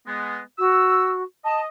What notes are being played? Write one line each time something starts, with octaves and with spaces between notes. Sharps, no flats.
G#3 B3
F#4 E6
D#5 A5